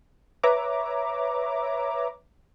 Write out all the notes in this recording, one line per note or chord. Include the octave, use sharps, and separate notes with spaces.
B4 C#5 E5 A#5 D6